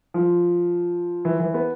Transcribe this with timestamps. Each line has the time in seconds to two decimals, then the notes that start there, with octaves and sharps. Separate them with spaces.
0.14 F3
1.25 E3
1.40 E3
1.54 B3